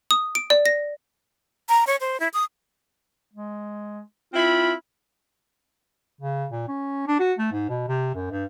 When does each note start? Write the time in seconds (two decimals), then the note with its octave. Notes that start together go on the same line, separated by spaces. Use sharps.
0.11 D#6
0.35 D7
0.50 D5
0.66 A#6
1.69 A#5
1.87 C#5
2.01 C5
2.20 E4
2.34 D#6
3.33 G#3
4.34 C4 E4 F4 B5
6.21 C#3
6.52 A#2
6.68 C#4
7.07 D4
7.20 F#4
7.39 A3
7.52 G#2
7.69 B2
7.88 C3
8.15 F#2
8.31 G2